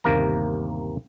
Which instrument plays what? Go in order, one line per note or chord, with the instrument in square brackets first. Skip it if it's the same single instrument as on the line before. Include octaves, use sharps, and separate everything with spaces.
[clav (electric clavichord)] G1 D#2 C3 A#3 A#4 A#5